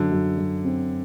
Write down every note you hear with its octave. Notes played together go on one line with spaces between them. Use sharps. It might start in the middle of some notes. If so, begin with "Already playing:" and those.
Already playing: F#2 D3
F#2
F#2
C4